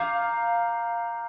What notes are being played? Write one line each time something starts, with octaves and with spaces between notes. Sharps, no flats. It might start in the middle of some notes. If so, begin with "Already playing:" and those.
Already playing: F5 A#5 D6 G6